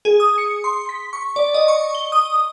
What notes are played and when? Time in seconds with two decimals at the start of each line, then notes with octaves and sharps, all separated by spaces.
0.05 G#4
0.20 D#6
0.38 C#7
0.64 C6
0.89 B6
1.13 C#6
1.36 D5
1.54 D#5
1.68 C#6
1.95 G7
2.12 D#6